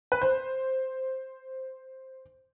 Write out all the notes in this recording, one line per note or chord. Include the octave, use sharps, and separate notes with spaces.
B4
C5